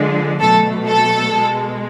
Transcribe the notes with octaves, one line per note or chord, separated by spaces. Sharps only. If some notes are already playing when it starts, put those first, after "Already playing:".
Already playing: D3 F3 G#3
B2 F#3 A3 A4
A4
B2 G#3